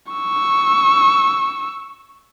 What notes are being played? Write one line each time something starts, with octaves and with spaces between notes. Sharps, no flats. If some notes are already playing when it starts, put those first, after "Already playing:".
C#6 E6